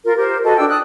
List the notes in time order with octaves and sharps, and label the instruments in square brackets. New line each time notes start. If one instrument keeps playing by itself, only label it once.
[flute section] F4 A#4
G4 A#4 C5
F#4 A4 B4 D#5
D4 F4 G5 E6
A5 D#6 F#6